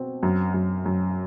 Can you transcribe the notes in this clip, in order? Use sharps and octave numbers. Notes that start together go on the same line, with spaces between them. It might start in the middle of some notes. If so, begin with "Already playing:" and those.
Already playing: B2 C4
F#2
F#2
F#2